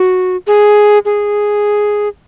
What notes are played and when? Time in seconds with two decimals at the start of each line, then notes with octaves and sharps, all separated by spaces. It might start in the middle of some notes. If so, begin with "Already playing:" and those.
Already playing: F#4
0.47 G#4
1.05 G#4